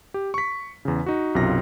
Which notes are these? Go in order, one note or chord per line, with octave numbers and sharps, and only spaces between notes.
G4
C#6 B6
E2 C#3
D#4 F#4
B1 F#2 C3 F4 A#6